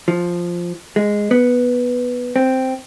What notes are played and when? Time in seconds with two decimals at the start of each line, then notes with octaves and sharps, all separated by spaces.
0.08 F3
0.96 G#3
1.31 B3
2.36 C4